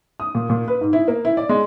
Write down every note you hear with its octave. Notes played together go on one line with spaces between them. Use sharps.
D#6
A#2
A#2
B4
G#2
E4
A#3
E4
D5
G#3